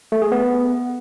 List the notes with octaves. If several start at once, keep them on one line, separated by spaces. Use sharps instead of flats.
A3
G#4
B3